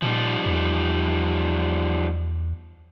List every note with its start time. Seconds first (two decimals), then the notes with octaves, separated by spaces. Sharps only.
0.02 A#2 F3 G3 D#4
0.46 E2